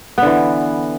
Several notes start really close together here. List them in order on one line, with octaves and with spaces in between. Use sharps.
B3 D3 E3